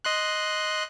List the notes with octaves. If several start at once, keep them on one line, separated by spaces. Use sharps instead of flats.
D#5 C6 F#6